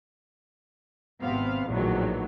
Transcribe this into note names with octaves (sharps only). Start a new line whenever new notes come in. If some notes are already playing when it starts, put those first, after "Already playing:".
G#1 C3 B3 C4 F5
A#1 E2 A2 D#3 F#3